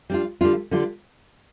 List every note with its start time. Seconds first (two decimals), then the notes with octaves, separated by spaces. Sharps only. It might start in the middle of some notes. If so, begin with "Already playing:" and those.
0.10 G3 D4 F4
0.41 D3 G3 D4 F4
0.71 D3 G3 D4 F4